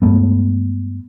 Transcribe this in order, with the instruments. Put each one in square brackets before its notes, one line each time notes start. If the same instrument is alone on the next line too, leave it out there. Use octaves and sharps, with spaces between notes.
[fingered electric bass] G2 G#3 A3 B3